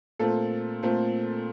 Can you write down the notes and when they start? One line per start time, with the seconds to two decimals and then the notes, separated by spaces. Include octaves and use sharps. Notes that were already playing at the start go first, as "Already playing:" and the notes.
0.19 A#2 A3 C4 A4
0.83 A#2 A3 C4